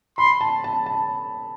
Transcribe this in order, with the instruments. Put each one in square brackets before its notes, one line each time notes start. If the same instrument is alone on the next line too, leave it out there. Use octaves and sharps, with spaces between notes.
[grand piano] B5 [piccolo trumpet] C6
[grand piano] A5
A5
A5